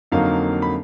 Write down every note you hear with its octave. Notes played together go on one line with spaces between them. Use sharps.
F2 D3 F#3 A#3 D#4 F5
B5